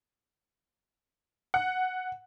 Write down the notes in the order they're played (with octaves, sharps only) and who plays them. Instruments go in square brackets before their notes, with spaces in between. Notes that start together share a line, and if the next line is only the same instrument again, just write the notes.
[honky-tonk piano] F#5